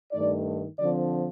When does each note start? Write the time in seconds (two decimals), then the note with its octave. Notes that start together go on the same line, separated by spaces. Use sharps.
0.12 G2 D#3 A3 D#4 D5
0.78 D3 F3 C4 D5